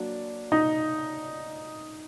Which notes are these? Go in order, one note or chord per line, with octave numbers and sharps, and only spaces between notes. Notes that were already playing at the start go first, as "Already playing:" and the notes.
Already playing: F#3 A#3 D4
D#4